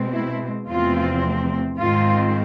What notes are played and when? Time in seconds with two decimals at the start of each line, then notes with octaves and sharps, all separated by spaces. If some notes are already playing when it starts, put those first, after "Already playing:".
Already playing: B2 G#3 C4
0.14 E4
0.68 E2 C3 F3 A3 C4 F4
1.78 G#2 D#3 G#3 C4 F4